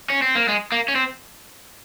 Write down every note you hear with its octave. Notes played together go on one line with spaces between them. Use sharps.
C#4
C4
A#3
G#3
A#3
C#4
C4